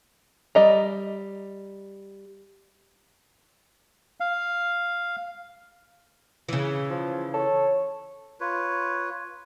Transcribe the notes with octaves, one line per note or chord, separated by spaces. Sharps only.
G3 D#5 A#5
F5
C#3 E3
F3
A4 C#5
F4 B4 C#5